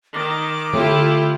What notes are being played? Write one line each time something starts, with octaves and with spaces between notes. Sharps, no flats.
D#3 D6
D3 A3 E4 F4 G4